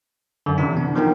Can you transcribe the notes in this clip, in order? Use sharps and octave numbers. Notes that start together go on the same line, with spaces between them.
F#2 D3
C3 E3 D4
B3
F3 B3 D#4 A#4 G5